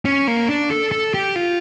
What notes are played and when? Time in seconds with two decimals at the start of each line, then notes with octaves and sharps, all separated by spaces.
0.05 C#4
0.28 A#3
0.49 D4
0.71 A4
0.92 A4
1.14 G4
1.36 F4